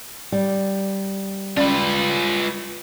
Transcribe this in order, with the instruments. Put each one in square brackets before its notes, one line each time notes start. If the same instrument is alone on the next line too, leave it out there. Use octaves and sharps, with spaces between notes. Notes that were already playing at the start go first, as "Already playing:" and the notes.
[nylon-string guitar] G3
[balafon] C#4 D5 [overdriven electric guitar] F4 B4